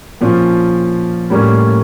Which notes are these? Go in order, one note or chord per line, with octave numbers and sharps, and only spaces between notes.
A#2 F3 C#4 F4
A2 G3 A#3 C#4